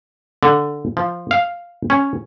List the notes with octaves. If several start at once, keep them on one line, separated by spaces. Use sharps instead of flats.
D3
F3
F5
C#4